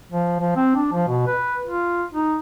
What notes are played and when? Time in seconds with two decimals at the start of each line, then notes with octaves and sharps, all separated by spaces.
0.12 F3
0.40 F3
0.56 C4
0.76 D4
0.93 F3
1.08 B2
1.27 B4
1.66 F4
2.14 D#4